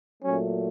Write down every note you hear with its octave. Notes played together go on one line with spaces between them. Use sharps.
A#2 F#3 A3 C#4